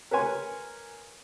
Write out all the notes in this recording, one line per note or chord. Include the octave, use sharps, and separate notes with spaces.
A#4 B4 C#5 G#5 C6